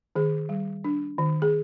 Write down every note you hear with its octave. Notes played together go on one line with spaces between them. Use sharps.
D#3 G#4
G3
D4
D#3
G#4